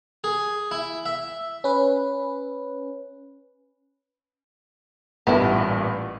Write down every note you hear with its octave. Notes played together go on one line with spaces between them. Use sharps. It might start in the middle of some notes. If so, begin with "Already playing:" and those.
G#4
E4
E5
C#4 B4
A1 G2 A#2 B3 E4